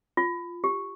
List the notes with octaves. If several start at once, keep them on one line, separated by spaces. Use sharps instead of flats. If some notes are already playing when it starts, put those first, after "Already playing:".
F4
G4